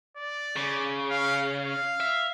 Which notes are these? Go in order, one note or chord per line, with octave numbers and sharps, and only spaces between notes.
D5
C#3
F5
F5
E5